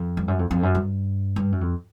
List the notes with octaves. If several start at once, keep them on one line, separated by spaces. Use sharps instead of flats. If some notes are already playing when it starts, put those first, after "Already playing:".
Already playing: F2
G2
F#2
F2
F2
F#2
G2
G2
F#2
F2